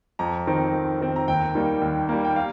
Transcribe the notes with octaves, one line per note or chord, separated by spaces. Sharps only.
F2 A#5
D#3 C4
F2
D#3 C4
A#5
D#2 G5
D#3 G3 A#3
D#2
D#3 G3 A#3
G5
F5